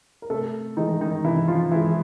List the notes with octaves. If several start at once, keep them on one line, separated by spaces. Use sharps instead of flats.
A#4
C3 A3 A4
D#3 E3 G#3 D#4
D#3 D#4
C3 E3 E4
F3 F4
E3 G#3 E4